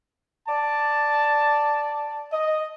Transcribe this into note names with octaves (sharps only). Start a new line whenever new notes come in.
D5 A5
D#5